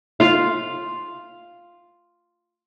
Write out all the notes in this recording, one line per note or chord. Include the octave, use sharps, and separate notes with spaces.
F4 F5